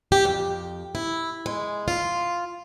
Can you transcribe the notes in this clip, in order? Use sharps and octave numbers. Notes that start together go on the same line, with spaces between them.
G4
F2
E4
G#3
F4